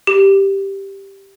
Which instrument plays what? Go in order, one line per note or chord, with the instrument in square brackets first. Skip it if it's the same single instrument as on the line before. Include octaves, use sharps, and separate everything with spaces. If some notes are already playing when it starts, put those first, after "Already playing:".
[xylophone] G4